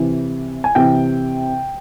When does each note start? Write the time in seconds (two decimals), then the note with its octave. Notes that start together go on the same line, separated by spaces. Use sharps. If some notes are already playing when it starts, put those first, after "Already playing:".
Already playing: C3 E3
0.64 G#5
0.75 C3 E3 G5